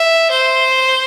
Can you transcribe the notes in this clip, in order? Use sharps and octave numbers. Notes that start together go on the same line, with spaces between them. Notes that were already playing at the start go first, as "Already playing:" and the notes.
Already playing: E5
C5